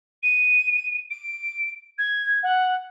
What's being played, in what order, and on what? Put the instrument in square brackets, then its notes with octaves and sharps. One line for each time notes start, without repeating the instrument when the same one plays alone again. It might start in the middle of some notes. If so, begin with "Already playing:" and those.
[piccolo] D#7
D7
G#6
F#5